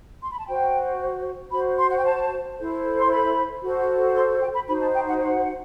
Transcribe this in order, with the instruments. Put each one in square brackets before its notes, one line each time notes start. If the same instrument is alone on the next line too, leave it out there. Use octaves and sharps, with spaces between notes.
[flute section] C6
B5
A5
F#4 C5 G5
F#4 C5 B5
C6
F#5
G5
A5
E4 A4 C5
C6
B5
F#4 A4 C5
C6
G5
B5
D#4 F#4 C5 B5
A5
G5
F#5
F#5